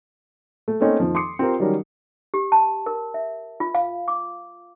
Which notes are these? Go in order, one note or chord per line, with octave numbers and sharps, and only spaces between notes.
A3
A3 A#3 C4 C#4 D#4
F2 D#3 F3
C6 D6 D#6 C7 C#7
C4 F4 G4 A#4
D#3 F#3 G3 C#4 A#4
G4
A5
A#4
E5
F4
F5
D6